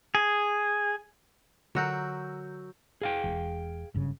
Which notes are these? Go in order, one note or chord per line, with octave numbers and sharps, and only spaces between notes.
G#4
D3 F#3 F#4 A#4 E6 G6
G#4 F5 G5
E1
F#1 G2 C#3